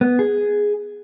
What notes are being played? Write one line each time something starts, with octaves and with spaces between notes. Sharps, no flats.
B3
G#4